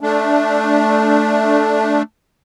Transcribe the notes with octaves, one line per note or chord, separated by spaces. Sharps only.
A3 D4